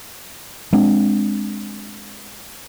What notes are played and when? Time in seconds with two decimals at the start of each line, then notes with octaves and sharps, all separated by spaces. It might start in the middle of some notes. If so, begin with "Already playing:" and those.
0.73 G#3 C4 D4